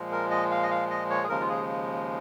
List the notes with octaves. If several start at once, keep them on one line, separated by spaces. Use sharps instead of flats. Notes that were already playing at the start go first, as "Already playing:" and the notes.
Already playing: A#2 F3 G#3
A#4
D#5
F5
D#5
F5
D#5
C#5
G#4
D#2 C#3 F3 G#3 A#4
F4
G#4